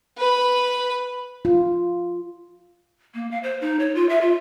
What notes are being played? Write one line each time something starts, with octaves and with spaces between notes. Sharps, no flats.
B4 B5
F4
A#3
F5
C5
D#4
C#5
F4
E5
F4